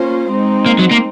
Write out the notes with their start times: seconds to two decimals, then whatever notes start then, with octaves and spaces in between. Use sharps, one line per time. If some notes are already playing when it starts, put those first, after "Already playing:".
Already playing: A#3 C#4 F4 C5
0.30 G#3 C4 D#4
0.66 A#3
0.79 F#3
0.91 A#3